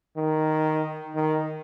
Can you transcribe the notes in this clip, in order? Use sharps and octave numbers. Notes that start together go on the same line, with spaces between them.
D#3
D#3